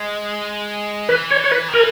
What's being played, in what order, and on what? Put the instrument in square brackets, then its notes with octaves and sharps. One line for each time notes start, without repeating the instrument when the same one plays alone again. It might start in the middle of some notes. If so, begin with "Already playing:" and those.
Already playing: [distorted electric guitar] G#3
[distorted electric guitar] E3 [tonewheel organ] B4
[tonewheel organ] C#5
C#5
B4
[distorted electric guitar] D#3
[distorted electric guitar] E3 [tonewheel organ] A#4